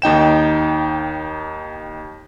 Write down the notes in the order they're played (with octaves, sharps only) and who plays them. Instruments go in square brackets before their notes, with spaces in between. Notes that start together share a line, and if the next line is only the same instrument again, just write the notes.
[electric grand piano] D#2 D#4 G5 E7